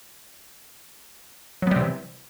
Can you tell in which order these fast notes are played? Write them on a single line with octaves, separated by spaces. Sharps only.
F#3 B3 G3 C3 E3